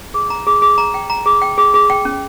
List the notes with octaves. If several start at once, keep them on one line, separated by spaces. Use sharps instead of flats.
G#4
A#5
G#4
G#4
A#5
G5
A#5
G#4
G5
G#4
G#4
G5
C#4